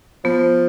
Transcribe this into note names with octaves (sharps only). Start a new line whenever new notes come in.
F3 B3